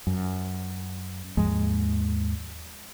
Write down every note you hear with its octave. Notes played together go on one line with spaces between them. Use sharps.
F#2
D#2 G#2 F3 G#3